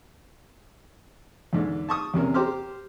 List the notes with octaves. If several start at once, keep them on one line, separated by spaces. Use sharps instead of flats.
E2 G#2 D3
A5 C#6 D#6
E2 C3 C#4 A#4
G4 C5 A#5 C6 D6 F6